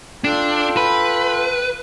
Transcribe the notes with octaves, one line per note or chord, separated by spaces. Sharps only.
D4 F4 A4 G5
B4